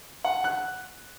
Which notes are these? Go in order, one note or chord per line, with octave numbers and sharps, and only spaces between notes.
F#5
F#6